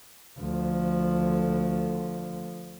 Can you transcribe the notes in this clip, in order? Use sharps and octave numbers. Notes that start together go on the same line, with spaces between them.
D2 F3